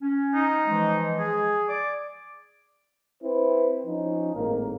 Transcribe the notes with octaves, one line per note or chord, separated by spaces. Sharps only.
C#4
D#4
E3 F3 G#3
G#4
D5 D6
C4 E4 B4 C5
F3 C#4 D#4
G#1 A2 A#3 A#4